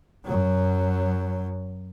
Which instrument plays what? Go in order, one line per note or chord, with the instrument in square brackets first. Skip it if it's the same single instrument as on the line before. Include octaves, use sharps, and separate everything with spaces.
[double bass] F#2 F#3